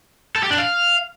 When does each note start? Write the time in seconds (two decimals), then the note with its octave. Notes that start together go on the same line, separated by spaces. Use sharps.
0.36 A4
0.43 G4
0.51 D4
0.58 F5